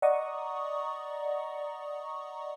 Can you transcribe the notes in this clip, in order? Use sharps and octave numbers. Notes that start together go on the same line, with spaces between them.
D5 D#5 F#5 A#5 C#6 D#6